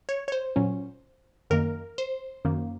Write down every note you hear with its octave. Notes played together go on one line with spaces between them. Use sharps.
C#5
C#5
C5
A#2 F#3 C#4
F#2 D#3 A#3 A#4
C5
F#2 D#3 A#3